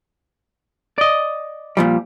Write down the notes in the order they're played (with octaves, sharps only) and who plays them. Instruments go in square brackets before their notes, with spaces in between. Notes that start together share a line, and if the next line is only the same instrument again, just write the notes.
[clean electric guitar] D5 D#5
[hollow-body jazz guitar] A#2 F3 G3